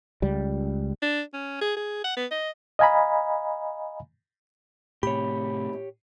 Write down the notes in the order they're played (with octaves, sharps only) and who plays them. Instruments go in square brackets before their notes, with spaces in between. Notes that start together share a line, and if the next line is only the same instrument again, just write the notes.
[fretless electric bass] C#2 G3
[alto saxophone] D4
C#4
G#4
G#4
F#5
B3
D#5
[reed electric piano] D#5 F5 G#5 A#5 B5
[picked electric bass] A2 C3 [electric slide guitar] G4 C#5 [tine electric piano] B5